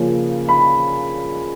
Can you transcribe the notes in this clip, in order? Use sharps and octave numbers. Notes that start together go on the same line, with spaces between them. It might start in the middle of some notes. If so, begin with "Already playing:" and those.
Already playing: C#3 F3 A#3 C#4
B5